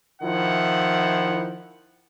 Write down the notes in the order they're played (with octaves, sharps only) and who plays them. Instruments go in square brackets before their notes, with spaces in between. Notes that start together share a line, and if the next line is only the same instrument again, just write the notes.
[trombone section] D#3 F3 E4 [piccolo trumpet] F#5